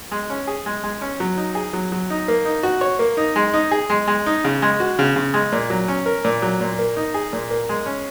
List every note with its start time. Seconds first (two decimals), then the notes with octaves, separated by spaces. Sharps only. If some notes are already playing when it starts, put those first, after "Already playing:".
0.11 G#3
0.30 C#4
0.47 G#4
0.66 G#3
0.84 G#3
1.01 C#4
1.20 F#3
1.37 D#4
1.55 G#4
1.73 F#3
1.92 F#3
2.10 D#4
2.28 A#3
2.45 D#4
2.63 F#4
2.81 C#5
2.99 A#3
3.17 D#4
3.36 G#3
3.54 D#4
3.71 G#4
3.90 G#3
4.08 G#3
4.26 D#4
4.45 C#3
4.62 G#3
4.80 F#4
4.99 C#3
5.16 C#3
5.34 G#3
5.52 A#2
5.70 F#3
5.88 C#4
6.06 A#4
6.24 A#2
6.42 F#3
6.61 A#2
6.79 A#3
6.96 D#4
7.14 G#4
7.33 A#2
7.50 A#3
7.69 G#3
7.86 C#4